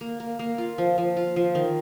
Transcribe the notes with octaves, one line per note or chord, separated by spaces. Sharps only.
A#3
A#3
A#3
F4
F3
F3
F4
F3
D#3